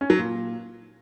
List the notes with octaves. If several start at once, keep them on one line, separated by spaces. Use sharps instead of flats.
C#4
F#3
A#2